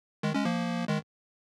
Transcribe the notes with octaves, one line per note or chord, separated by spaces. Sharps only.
D#3 G#3
G#3 C#4
F3 A#3
D#3 G#3